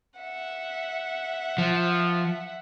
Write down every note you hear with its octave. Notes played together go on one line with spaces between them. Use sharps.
E5 F#5
F3